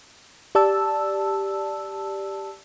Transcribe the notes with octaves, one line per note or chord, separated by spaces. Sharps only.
G4 D5 A5 E6